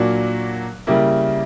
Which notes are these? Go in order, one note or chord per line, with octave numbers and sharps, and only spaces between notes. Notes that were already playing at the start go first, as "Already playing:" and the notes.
Already playing: A#2 F#3 A#3 D4 F#4
C#3 G3 A#3 E4